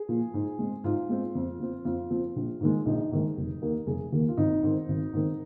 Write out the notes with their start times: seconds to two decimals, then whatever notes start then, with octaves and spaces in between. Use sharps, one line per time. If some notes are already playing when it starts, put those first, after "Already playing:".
Already playing: G#4
0.09 A#2 F3
0.34 G#2
0.59 G#3 C4
0.84 G#2 F4
1.09 G#3 C4
1.35 F2
1.60 F3 C4
1.85 F2 F4
2.10 F3 C4
2.36 A#1
2.61 G#2 D#3 G#3
2.86 A#1 D#4
3.11 G#2 D#3 G#3
3.37 F1
3.62 D#2 D#3 A#3
3.87 F1 G#4
4.12 D#2 D#3 A#3
4.29 F4
4.38 G#1 D#4
4.63 G#2 D#3 C4
4.88 G#1
5.13 G#2 D#3 C4